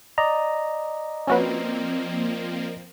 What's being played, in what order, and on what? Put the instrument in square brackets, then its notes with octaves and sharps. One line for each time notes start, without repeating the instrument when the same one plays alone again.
[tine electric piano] D5 D#5 A#5
[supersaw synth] F3 A#3 C4 [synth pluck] C#4 F#4 B4